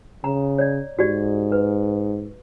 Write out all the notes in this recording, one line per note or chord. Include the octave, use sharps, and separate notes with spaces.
C#3 A#5
C#5 D5
G#2 F#4 G4 D5
B4